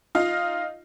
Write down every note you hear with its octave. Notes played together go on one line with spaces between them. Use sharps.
D#4 F4 D#5 F5